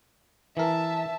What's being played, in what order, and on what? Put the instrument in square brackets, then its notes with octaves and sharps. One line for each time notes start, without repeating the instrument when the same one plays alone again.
[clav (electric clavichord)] E3 A#4 [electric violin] E5 A5